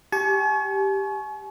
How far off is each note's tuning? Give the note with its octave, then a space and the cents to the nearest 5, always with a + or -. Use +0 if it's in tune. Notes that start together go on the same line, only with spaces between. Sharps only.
G4 +0 G#5 +45 C#6 +0